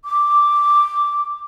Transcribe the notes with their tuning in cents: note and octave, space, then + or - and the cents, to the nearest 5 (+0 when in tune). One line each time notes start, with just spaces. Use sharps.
D6 +0